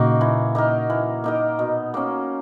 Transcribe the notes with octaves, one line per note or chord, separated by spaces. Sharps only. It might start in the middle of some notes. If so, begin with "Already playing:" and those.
Already playing: A#2 C#3 A#3 D#4 F#4
E3
A#3 D#4 A#4
E3
A#3 D#4 A#4
B2
A#3 C#4